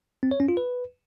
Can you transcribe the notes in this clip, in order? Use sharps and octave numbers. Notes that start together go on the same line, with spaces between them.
C4
C#5
C#4
F4
B4